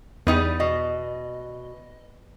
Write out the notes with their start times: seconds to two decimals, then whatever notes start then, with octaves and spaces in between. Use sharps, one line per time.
0.27 E2 G3 D#4 B4
0.60 B2 D#5